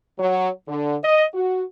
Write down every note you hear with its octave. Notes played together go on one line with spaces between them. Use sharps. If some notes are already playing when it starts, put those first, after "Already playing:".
F#3
D3
D#5
F#4